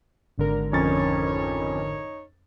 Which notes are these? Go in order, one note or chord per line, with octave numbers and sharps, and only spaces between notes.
G#1 D3 A#4
F2 C#4 D#4 C#5 A6